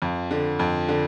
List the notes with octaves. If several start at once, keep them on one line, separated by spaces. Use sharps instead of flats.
F2
D3
F2
D3